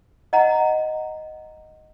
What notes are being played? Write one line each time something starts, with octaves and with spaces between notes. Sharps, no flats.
D#5 F#5 A#5